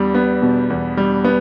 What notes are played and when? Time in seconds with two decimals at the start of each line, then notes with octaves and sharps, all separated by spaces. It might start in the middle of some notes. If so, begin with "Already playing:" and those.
Already playing: E2 G3
0.14 B3
0.42 B2
0.70 E2
0.97 G3
1.24 B3